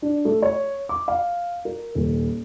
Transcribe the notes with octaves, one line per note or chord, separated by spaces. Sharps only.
D4
A3
C#5
D6
F5
A#4
D#1